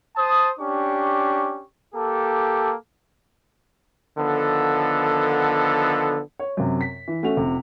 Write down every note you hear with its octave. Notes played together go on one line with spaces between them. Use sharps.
C5 A5 D#6
C#4 D4 G4 C#6
A#3 G4 A4
D3 D#3 F3 B3 A4
C#5
F#2 C3
B6
E3
A3 C#4 F#4 F7
F1 C3